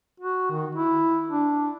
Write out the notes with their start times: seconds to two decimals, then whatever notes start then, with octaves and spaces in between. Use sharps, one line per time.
0.20 F#4
0.51 D#3
0.75 E4
1.31 D4